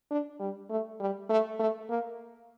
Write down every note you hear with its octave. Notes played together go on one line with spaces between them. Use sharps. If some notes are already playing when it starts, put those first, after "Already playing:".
D4
G3
A3
G3
A3
A3
A#3